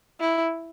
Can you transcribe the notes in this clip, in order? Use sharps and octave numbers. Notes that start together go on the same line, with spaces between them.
E4